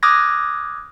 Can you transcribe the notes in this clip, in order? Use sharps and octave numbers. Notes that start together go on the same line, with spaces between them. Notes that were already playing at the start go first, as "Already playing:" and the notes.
D6 D#6 F6 F#6 G#6 A#6